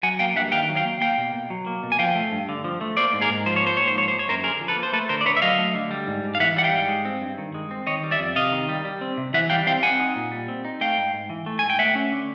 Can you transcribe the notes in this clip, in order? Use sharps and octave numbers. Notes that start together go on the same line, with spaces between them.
F#3 F#5 G#5
A#3 F5 G5
G2 E5 F#5
D#3 F5 G5
F#3
F5 G5
A#3
A#3 F5 G5
B2
B2
F#3
A#3
B2
G#5
F3 F5 G5
A3
G2
D3
F3
A3
A#3 C5 D5
G#2
G#4 A#4
G#2
F3 C5
C#5
A#3 C5
G#2 C#5
C5
F3 C#5
A#3 C5
C#5
F#2 A#4 C5
D3 G#4 A#4
F3
A4 B4
A#3
C5
A3 A4 B4
D3 A#4 C5
D5
D3 B4 C#5
E5
F#3 D#5 F5
A3
D3
G3
G#2
G#2
F5
E3 E5 F#5
G3 F#5
F5 G5
G#2
G#3
C4
G2
D#3
G#3
C4
D#3 C#5 D#5
G3
D5 E5
F2
C3 D#5 F5
D#3
G3
G3
C4
C3
E3 E5 F#5
G3 F5 G5
C4 F5 G5
C4 F#5 G#5
D#4
A#2
G3
C4
D#4
A3 F5 G5
G#2
G#2
E3
A3
G#2 G#5
G5
A3 E5 F#5
C#4
D3